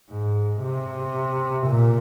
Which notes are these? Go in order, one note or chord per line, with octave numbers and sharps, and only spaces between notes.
G#2
C3
A#2